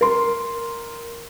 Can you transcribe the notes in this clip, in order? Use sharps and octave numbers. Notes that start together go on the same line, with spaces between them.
A#4 C6